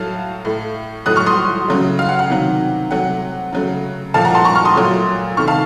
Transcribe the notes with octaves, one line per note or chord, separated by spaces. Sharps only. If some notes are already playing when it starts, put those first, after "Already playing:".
Already playing: A2 F#3 A3 F5 A5
A2 A3
A2 F#3 A3 D#6 F#6
C#6 F6
C6 D#6
C#3 F#3 A3
F5
F#5
F#5
C3 D#3 F#3
C3 F#3 A3 F#5
C#3 F#3 A3
A#2 F3 A3 F5 A5
F#5 A#5
A5 C6
A#5 C#6
C#6 F6
C6 D#6
A#2 F#3 A3
C3 D#3 A3 C#6 F6
F5 A5